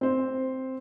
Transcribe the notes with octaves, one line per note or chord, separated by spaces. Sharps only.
C4 C5